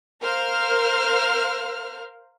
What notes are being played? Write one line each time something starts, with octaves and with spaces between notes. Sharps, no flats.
A#4 C5 F5 F6